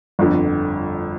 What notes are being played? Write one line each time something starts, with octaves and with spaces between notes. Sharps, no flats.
G1 F2 D3